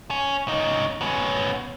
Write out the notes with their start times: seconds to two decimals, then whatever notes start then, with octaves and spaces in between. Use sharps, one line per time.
0.11 C#4
0.48 C#3 D#4
1.01 B3 C#4